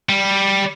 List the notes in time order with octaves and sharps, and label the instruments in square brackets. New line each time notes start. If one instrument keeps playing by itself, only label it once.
[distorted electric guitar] G3